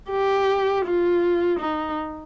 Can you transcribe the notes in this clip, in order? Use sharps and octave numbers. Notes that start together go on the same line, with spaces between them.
G4
F4
D#4